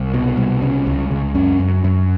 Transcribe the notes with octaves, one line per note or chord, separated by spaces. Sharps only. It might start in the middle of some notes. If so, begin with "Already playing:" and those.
Already playing: C2
B2
C2
C#3
C#2
C#2
F#2 C#4
F#2
F#2